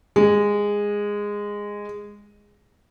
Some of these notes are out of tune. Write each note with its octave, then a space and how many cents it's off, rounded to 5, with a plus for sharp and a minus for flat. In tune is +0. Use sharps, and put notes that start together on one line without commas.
G#3 -15